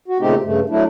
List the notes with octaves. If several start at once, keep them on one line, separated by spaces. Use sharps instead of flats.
F#4
A#2 C#3 A3 C4 D#4 G4
G2 C#3 A3
F#3 A3 D4 E4